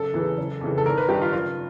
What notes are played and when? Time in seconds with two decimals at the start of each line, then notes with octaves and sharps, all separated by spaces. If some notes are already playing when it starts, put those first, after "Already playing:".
Already playing: F#1 A4
0.14 E2 C#3 E3
0.38 F#1
0.61 F2 C#3 E3
0.78 A4
0.86 G#1 A#4
0.98 B4
1.09 G2 D#3 G4
1.22 F4
1.32 F#1 F4